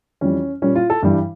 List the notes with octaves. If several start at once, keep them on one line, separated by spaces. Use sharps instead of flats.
F2 E3 G3 C#4
A#2 G3 C#4
F4
A4
G2 E3 G3